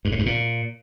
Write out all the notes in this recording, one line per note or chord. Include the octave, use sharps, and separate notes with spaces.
G2
A2
G2
A#2